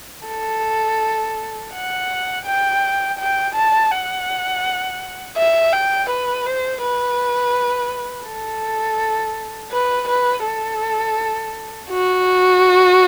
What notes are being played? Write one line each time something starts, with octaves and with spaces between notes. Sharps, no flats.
A4
F#5
G5
G5
A5
F#5
E5
G5
B4
C5
B4
A4
B4
B4
A4
F#4